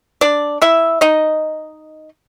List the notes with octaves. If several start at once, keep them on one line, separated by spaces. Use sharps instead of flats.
D4 D5
E4 E5
D#4 D#5